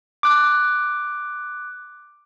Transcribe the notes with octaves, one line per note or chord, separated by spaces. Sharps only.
D6 F#6